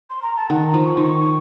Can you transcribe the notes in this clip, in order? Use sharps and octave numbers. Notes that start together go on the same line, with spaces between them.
C6
A#5
A5
D#3 F#5
A#5
F3
C#6
D#3 C6
C#6
C#6